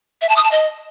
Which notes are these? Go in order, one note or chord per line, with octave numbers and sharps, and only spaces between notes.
E5
A5
D#6
A5
D#5